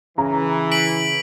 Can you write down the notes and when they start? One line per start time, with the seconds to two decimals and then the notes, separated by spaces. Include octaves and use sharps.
0.18 C#3 E3 A#5
0.71 B6 D7 F#7